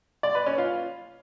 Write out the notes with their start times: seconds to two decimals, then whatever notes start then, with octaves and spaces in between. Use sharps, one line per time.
0.23 D5
0.35 B4
0.46 C#4
0.58 F4